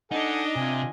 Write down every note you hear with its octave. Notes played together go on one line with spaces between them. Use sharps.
D4 D#4 A4 D#5 F#5 G#5
C3 F4 G#5